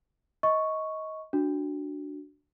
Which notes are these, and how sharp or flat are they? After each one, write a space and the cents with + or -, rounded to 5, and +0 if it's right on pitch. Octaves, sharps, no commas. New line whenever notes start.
D#5 +20 C#6 +0
D4 +0 F#4 +0